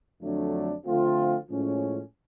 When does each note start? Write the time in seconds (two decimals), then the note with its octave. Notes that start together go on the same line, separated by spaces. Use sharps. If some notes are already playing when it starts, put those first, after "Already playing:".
0.22 F2 D3 F#3 A3 D4
0.86 D3 F3 A3 C4 F4
1.50 A2 F3 G#3 C#4